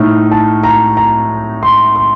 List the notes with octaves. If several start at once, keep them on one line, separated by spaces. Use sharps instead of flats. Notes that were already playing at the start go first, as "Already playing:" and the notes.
Already playing: A2 A3 D#4 F6
A5
A#5
A#5
C6
C6